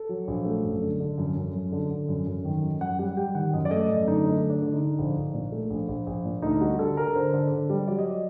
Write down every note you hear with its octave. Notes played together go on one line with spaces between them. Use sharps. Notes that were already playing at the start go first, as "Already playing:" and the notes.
Already playing: A4
F#3
A#1
A3
F#2
D3
D3
F#2
F#2
F#2
D3
D3
F#2
F#2
D#3
F#2
F#2 F#5
G3 F#5
G3 G5
D#3 F#5
F#2 D#5
D5
A3 D#5
F#2 D5
D3 D#4
A3 D4
D3
D4
D3
D#4
D3
A#1
A#1
A#2
A3
A#1
A#1
A#1
A#2
D2 D#4
G3 F#4
D3 A4
D3 A#4
D3 C5
D3
D3
G3
F#3 D5
D#5
D5